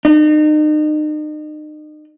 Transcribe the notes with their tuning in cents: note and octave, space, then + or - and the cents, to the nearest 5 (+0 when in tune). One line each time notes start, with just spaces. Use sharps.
D#4 -35